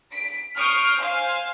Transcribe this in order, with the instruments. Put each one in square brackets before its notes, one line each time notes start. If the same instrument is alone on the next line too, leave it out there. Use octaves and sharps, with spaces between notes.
[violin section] B6 D7
C#6 D#6 F6 G6 C7 D7
C5 F5 G#5